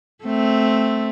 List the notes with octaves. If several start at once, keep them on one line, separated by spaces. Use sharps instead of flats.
A3 C4